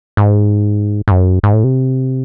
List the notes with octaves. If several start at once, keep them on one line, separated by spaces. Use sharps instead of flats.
G#2
G#2
F#2
G#2
A2
C3